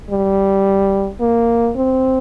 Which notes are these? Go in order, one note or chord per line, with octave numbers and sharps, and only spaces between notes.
G3
A#3
C4